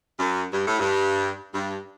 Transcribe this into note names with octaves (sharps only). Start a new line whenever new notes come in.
F#2
G2
A2
G2
G2